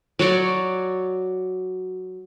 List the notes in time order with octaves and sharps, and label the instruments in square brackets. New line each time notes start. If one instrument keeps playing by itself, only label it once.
[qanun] F#3 F#4 C#5 D5